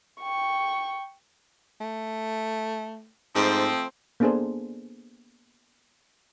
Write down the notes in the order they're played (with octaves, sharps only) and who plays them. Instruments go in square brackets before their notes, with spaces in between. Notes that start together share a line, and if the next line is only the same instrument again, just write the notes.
[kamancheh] G5 C#6
[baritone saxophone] A3
[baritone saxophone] G#2 [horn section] F3 A3 C4
[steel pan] A#3 B3 D4 G#4 A4 C5